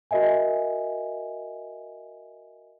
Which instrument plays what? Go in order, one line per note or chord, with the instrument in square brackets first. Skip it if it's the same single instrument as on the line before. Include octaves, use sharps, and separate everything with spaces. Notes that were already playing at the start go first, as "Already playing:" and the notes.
[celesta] F#4 A#4 D#5 E5 G#5